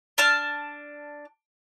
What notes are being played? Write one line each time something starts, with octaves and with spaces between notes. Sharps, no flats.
D4 A5 F6